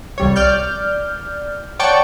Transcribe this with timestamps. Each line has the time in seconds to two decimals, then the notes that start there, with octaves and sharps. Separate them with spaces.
0.18 C2 G3 C#5
0.36 D5 F6 G6
1.79 C#5 D5 F#5 G5 A5 C#6